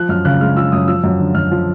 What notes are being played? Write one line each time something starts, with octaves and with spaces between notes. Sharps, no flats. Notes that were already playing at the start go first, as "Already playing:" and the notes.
Already playing: F3 F#6
F#2 F6
C#3 F#6
G#3 F6
F3 E6
F#2 D#6
F3 E6
F#2
D3
F#2 F6
F3